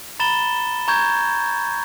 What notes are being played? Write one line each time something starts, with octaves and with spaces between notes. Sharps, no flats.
A#5 B5 A6 E7 G7
A#5 C#6 G6 G#6